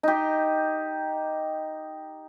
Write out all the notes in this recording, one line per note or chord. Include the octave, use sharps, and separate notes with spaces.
D#4 G4